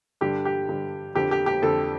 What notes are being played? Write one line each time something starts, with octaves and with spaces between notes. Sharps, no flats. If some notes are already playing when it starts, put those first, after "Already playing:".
G2 D3 G4
G4
G2 D3
F2 D3 G4
G4
G4
F2 D3 A4